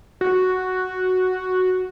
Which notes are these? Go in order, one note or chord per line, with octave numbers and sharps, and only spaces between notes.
F#4